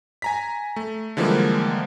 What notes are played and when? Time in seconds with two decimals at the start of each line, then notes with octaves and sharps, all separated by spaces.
0.22 G#5 A#5 B6
0.76 A3
1.17 D3 E3 F3 G3 G#3 A#3